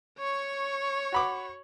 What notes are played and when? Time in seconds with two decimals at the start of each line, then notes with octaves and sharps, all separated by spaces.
0.19 C#5 C#6
1.12 F#4 B5 D6